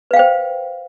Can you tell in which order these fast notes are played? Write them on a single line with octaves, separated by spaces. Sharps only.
B4 F5 G5 C5